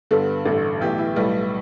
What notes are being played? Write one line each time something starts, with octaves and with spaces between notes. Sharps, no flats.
G2 D3 B3 A4
A1 G2 D3 A3
B1 A2 E3 G4
E4
B1 A2 G3 B3